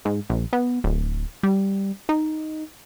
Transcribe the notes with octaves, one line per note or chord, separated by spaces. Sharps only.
G#2
A#1
B3
D1
G3
D#4